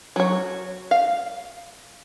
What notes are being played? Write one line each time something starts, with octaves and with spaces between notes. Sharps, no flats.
F#3 C#5
F5